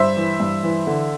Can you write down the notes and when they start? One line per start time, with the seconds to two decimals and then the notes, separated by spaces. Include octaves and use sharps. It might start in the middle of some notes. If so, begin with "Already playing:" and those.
Already playing: G2 C5 E5
0.17 E3
0.40 G2
0.63 E3
0.87 D3